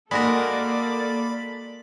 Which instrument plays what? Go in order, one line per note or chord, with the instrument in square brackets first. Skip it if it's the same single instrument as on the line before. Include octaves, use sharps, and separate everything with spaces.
[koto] G#3 F#4 A#4 [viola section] A#3 A4 [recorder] D5 [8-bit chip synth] B5